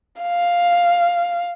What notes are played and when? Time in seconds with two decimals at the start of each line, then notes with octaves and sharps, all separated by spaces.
0.22 F5